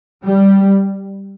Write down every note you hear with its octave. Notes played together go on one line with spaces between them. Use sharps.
G3